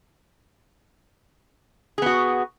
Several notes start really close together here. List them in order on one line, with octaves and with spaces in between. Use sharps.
G#4 B3 F#4